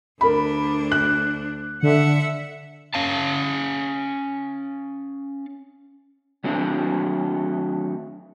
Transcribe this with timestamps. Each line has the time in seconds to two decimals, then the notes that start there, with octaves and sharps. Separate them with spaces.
0.21 D2 D4 A#4 B5
0.92 F#6
1.83 D3 E5 F#5
2.94 C#4 F5 A5
6.44 D#3 F#3 A3 C4 D4